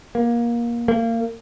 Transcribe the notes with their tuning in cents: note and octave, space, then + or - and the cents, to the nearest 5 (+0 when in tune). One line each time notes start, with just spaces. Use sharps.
A#3 +20
A#3 -25